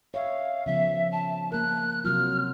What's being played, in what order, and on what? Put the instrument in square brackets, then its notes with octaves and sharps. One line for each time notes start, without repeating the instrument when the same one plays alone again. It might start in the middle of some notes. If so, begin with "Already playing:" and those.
[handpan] C#5 E5 [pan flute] F5
[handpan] C#3 F3 B3 [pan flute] E5
[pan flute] A5
[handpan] A#3 A#4 [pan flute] F#6
[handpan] C3 F#3 F4 [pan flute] F6